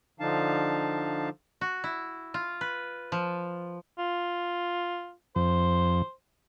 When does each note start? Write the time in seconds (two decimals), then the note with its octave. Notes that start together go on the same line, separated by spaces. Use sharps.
0.20 D3 F3 D4 D#4 F5 A5
1.61 F#4
1.84 E4
2.34 F4
2.61 B4
3.12 F3
3.99 F4
5.36 F2 C5